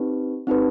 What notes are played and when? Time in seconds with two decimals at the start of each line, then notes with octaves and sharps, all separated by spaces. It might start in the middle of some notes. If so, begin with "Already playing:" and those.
Already playing: C4 D#4 G4 B4
0.47 C4 D#4 G4 B4